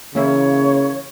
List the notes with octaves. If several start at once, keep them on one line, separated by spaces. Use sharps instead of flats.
C#3 E3 A#3 E4 C#5